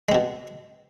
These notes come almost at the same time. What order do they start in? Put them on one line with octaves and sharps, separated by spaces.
G#3 C4 B2